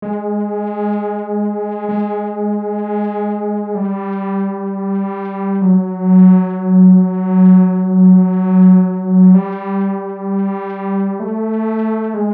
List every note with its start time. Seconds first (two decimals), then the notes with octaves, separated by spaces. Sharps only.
0.02 G#3
1.89 G#3
3.75 G3
5.61 F#3
9.34 G3
11.20 A3
12.14 G#3